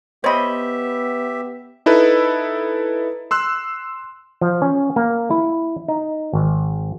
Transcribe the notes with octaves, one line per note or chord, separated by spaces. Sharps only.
B3 G4 C5 C#5 D#5 E5 B5
D#4 E4 A4 B4
C6 E6 F#6
F3
C#4
A#3
E4
D#4
G#1